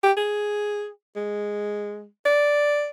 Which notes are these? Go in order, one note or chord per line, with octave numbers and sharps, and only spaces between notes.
G4
G#4
G#3
D5